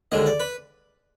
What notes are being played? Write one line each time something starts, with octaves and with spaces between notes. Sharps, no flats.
D#2 D3 G#3 D#5
D5
B4